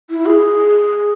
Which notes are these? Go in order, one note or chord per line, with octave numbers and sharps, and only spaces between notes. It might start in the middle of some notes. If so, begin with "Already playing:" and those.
E4
G#4